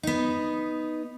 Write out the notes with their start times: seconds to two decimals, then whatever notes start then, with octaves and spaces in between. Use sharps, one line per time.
0.03 B3 D#4